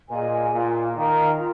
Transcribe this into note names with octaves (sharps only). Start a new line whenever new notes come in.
A#2 G#4 D#5 G#5
A#2 F4
D#3 A#4 F5 A#5
F4